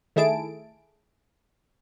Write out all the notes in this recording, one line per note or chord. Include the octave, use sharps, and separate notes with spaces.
D#3 A3 E4 G#4 A5 D7